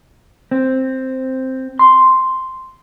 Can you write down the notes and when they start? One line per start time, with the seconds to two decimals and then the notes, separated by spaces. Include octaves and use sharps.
0.51 C4
1.79 C6